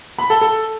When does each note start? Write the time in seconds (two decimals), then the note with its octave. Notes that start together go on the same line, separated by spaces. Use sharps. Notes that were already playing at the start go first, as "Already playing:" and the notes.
0.19 B5
0.30 A4
0.41 A4